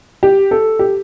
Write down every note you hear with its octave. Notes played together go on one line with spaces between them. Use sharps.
G4
A4
G4